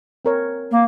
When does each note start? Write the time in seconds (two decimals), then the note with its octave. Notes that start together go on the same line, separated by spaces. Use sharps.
0.25 C4 A#4 C#5
0.71 A#3